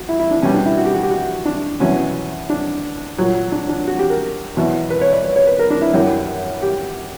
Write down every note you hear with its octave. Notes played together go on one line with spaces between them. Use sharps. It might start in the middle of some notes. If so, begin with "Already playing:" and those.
Already playing: F#4
E4
E4
D4
B2 G3 C#4
D4
E4
F#4
G4
F#4
G4
F#4
D4
E2 B2 F#3 C#4
D4
A#2 F#3
D4
D4
F#4
G4
A#4
E2 B2 F#3
B4
C#5
D5
C#5
C#5
B4
A#4
D4
E4
F#2 E3 G3
G4